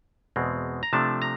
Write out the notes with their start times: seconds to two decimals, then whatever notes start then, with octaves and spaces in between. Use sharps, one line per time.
0.36 E2 B2 G#3 C4
0.83 A#5
0.93 C3 F3 A3 D4 A5
1.22 A#5